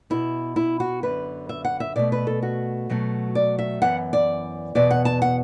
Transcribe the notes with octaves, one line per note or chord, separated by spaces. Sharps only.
B2 B3 E4
E4
F#4
F#2 D3 B3 B4
E5
F#5
E5
B2 A3 D5
B4
A4
F#4
B2 F#3 A3
D5
E5
F#2 E3 B3 F#5
D5
E2 B2 B3 D5
F#5
A5
F#5